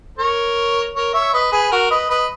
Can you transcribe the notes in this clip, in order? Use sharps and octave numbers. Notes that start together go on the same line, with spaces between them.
A#4 C#5
A#4 C#5
C#5 E5
B4 D#5
G#4 B4
F#4 A#4
B4 D#5
B4 D#5